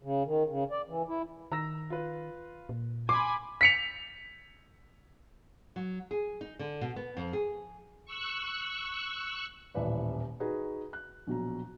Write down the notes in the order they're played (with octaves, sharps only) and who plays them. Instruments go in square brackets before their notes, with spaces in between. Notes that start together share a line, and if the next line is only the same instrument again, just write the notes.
[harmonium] C#3
D#3
C#3
D5
E3
E4
[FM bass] D#3 [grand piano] A#5 E6 A#6
[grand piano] F4 B4
[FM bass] A#2
[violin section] G#5 B5 [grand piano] C6 C7 [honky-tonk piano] D6
[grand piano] B6 C#7 F7
[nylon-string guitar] F#3
G#4
D#4
D3
B2
B3
F2
G#4
[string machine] C#6 E6 F#6
[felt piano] D#1 A1 E3 B4 D5
D#4 F#4 G#4 B4
F#6
A#1 B2 F#3 A#5